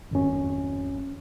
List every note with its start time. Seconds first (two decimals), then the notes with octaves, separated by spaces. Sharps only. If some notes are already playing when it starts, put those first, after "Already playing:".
0.11 G#1 F2 C#4